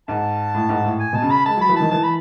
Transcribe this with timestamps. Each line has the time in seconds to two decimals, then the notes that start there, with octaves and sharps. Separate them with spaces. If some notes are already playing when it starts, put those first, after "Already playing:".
0.08 G#2 A5
0.54 A2
0.69 G#2
0.84 A2
1.00 G#5
1.13 B2 A5
1.22 C#3
1.30 B5
1.46 G#3 A5
1.57 F#3 B5
1.69 E3
1.76 D#3 A5
1.91 E3 A5
2.03 B5